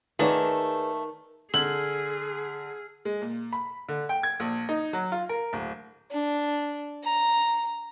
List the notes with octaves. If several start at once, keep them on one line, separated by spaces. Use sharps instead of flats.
D#3 A3 A#3 G#4 B4 D5 F#5
D3 G#4 E6 F6 G#6 F#7
G#3
A#2
B5
D3
G5
G#6
A#1
D#4
F#3
F4
A#4
D1
D4
A#5